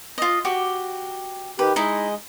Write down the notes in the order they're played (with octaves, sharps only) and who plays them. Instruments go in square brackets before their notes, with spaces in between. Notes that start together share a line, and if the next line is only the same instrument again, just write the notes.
[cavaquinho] F4 D#5
F#4 G4
[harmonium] D#3 G4 [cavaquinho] B4
[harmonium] G#3 D#5 [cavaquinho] D#4 E4